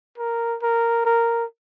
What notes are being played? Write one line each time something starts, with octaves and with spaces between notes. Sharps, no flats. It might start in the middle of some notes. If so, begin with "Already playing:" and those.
A#4
A#4
A#4